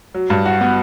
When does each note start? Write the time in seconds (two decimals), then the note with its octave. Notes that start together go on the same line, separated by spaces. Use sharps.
0.15 F#3
0.30 G2
0.45 F#4
0.61 B3